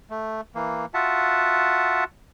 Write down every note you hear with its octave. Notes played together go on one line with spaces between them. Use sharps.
A3
E3 A#3
F4 F#4 E5 F#5 A5